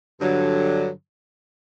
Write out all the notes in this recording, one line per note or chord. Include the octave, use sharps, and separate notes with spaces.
G2 D3 F#3